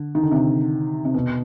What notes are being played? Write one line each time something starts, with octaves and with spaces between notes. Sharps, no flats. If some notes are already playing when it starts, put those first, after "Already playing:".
Already playing: D3
D#3
D3
C3
C3
B2